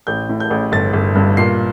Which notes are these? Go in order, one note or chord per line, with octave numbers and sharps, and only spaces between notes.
A1 G6
A2
G6
A1
G1 A6
G1
G2
A#2 C7